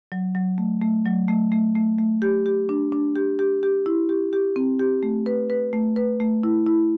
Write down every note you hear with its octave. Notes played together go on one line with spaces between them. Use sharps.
F#3
F#3
A3
A3
F#3
A3
A3
A3
A3
G4
G4
D4
D4
G4
G4
G4
E4
G4
G4
C4
G4
A3
B4
B4
A3
B4
A3
E4
E4